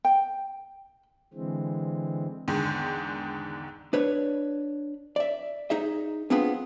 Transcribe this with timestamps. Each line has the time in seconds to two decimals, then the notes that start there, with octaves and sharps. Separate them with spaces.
0.05 G5
1.34 D3 E3 G#3 C4
2.48 E2 G#2 D3 D#3
3.93 D4 B4 C#5
5.16 D5 E5
5.70 D#4 G#4 D#5 E5
6.30 B3 C4 D4 F4 G#4 B4